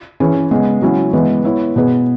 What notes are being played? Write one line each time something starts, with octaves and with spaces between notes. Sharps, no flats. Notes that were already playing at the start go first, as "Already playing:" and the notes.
E3 C#4 G#4 C#5
C#3 G#3 B3 G#4
C#3 F#3 C#4 E4
E3 G#3 B3
B3 E4 C#5
B2 B3 G#4 B4